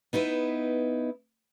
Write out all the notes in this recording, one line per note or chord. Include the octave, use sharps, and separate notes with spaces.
B3 D#4 E4 B4